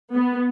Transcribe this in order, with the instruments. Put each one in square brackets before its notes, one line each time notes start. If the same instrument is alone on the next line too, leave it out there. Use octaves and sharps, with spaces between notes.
[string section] B3